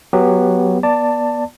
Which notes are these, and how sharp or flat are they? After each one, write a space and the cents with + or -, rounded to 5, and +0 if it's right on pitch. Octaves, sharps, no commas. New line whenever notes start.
F#3 +0 B3 -5 G4 +10
B3 -30 D5 +0 A5 +15